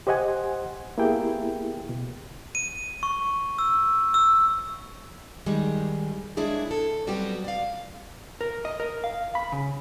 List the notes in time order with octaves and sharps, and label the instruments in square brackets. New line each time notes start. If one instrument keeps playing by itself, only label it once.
[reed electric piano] G4 C5 D#5 F#5 G#5
A#3 B3 E4 G4 G#4 G5
B2
[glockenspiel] D#7
C#6
E6
E6
[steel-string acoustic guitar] D#3 G3 G#3
G#3 A#3 D4 E4 G#4 C#5
A4
F#3 G3 B3 C4 F#4 G4
D5 F5
[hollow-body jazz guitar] A#4
D#5
A#4
F5
B5
C#3